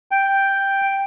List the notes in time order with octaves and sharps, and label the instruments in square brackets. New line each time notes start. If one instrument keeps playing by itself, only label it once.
[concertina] G5